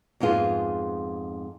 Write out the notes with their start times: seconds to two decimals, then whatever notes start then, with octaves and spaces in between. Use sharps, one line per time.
0.20 F2 G#2 B3 F4 G#4